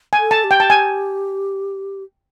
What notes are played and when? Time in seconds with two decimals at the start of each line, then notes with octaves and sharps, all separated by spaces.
0.13 G#5
0.19 A4
0.31 A5
0.44 G4
0.51 G5
0.60 A5
0.70 G#5